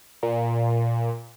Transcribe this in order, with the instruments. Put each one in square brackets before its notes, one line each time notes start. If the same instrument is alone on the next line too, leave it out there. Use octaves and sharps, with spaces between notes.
[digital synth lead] A#2